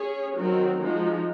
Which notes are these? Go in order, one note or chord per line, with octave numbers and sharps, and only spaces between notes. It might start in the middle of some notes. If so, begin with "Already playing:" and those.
Already playing: C#4 G#4 C#5
D#3 F#3 C4 F#4 A#4
F3 G#3 D#4 F#4